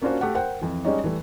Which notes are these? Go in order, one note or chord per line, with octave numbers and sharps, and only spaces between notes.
A#3 C#4 D4 F4 F#4 C5
A3 G4 F#5
A#4 C5 F#5 G5
F2 E3
G3 G#3 C#4 D#4 C#5 D#5
E3 G3 A3